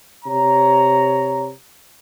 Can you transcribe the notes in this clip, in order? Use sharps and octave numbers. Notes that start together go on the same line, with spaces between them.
C3 C#5 A#5